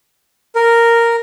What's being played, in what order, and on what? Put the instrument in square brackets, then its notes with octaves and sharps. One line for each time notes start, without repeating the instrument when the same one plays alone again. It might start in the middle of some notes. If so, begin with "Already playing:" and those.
[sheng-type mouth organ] A#4